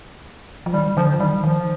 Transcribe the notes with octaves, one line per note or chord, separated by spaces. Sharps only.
F3
D#3 G3
D3 F3
F3
D#3 G3
D#3 F3